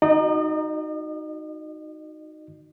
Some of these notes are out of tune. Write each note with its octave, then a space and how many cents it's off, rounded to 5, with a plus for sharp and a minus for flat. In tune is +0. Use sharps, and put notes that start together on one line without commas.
D#4 +0 F#4 -10 D#5 -45